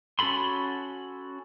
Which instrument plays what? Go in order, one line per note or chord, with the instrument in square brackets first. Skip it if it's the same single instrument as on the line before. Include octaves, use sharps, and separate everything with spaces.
[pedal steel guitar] C#4 F#4 A4 B5 C6